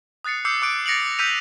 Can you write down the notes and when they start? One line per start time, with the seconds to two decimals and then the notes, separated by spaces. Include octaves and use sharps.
0.24 D#6 F#6 A6 C7 C#7
0.45 D6 E6 G6 C7 C#7
0.62 D6 F#6 D7
0.86 A6 A#6 C#7 D7 F7 F#7
1.19 E6 F#6 G6 B6 D#7 F7